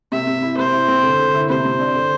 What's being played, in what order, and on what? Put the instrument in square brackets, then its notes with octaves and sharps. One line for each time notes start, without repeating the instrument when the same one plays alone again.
[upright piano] C3 [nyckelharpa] E5
[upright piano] C3
E4
[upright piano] C3 [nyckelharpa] C5
[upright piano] E4
C4
D3
D3
E4
[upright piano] C3 [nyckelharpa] C5
[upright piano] C3
D4
D3